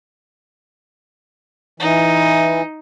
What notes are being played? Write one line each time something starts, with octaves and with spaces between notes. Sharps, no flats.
E3 D#4